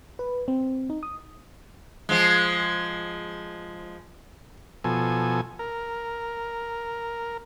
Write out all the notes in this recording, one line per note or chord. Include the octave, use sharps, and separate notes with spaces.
B4
C4
D#4
D#6
F3 G#3
B2 F3 A4 G#5
A#4